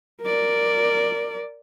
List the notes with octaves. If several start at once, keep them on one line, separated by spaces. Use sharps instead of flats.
A#4 D5